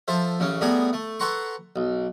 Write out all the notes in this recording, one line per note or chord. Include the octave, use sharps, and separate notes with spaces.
F3 A4 C5 E5
A1 C#3 C#4
A2 G3 B3 G#4 A#5
A3
A4 B4 F#5 A#5 C6 C#6
B1